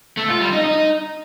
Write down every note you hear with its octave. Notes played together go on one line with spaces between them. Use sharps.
A3
F4
G3
D#4
D#4